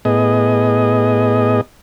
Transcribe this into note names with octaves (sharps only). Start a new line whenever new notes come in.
A2 B3 G#4 D#5